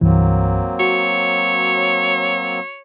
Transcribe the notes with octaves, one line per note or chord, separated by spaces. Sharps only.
C2 G2 E3 F#3 A#3 C4
F#4 C#5